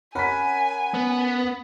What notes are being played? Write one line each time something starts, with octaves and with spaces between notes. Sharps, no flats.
C#4 A#4 F#5 G#5 B5 B6
B3